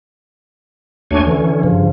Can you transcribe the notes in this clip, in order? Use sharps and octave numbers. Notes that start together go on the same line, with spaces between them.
D#2 A3 D4 F#4 C#5 G#5
D3 E3 C#4
G2 C#3 F3